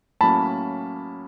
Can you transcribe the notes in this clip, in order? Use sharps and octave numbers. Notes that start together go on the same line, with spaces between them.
A2 F#3 A#3 C#4 A5 B5